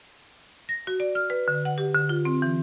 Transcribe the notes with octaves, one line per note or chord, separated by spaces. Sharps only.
A#6
F#4
D5
F6
B4
D3
F#5
G4
D3
F4
C4
E3